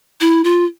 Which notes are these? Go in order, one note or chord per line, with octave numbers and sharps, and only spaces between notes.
E4
F4